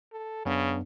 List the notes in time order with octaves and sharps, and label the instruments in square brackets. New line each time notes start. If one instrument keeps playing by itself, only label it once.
[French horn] A4
[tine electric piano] F#2 B3 D4 [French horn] C#3